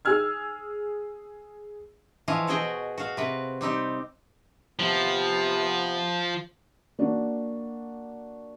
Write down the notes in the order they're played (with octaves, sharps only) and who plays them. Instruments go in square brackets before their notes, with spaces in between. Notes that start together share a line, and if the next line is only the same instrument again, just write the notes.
[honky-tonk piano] G#4 E6 F6 G#6
[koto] E3 F3 C#5 D#5 F5
B2 F#4 G#4 D#5 G5
F#4 F5
C3 B4
G3 C4 D#4 G4
[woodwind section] C3 B3 [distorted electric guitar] F3
[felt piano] A#3 D4 F#4